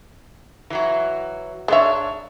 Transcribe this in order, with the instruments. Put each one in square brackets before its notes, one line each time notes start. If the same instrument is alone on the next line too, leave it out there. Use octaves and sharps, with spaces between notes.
[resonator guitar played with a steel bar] E3 F#3 F#4
[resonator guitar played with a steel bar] G#2 D4 C#5 [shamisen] G#3 E5